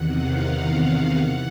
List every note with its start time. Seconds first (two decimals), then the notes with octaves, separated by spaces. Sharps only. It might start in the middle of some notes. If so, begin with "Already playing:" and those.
Already playing: E2 C3 D#3 F#5
0.11 F5
1.18 E3 F#5